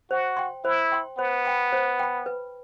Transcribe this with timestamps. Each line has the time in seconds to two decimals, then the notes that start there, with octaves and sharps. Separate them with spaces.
0.10 F#4 C5
0.37 G5 C6
0.64 E4 C5
0.92 G5 C6
1.18 B3 C5
1.45 G5 B5
1.73 C5
1.99 G5 B5
2.26 B4